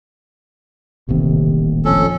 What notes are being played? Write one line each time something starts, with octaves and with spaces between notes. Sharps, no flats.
D#1 A1 D#2 C3
F2 C#4 A4